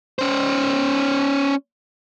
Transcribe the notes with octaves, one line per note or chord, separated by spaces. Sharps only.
C#4 C5